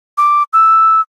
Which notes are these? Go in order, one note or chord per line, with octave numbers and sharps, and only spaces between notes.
D6
E6